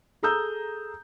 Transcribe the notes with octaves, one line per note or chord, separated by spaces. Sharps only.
G#4 A4 A#5 D#6 E6 G6